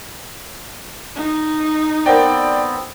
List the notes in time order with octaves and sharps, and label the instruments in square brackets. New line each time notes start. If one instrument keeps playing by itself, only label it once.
[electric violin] D#4
[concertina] B3 C4 [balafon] A#4 C5 F#5 [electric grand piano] D5 G5